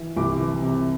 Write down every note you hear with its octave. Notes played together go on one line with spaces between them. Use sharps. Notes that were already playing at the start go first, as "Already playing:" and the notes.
Already playing: E3
C2 D6
E3
C3